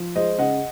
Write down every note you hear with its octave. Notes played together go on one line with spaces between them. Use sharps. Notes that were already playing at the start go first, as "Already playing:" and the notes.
Already playing: F3
G#3 C5 D#5
C#3 D#5 F#5